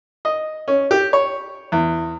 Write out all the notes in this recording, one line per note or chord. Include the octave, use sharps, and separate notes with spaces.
D#5
C#4
G4
C#5
E2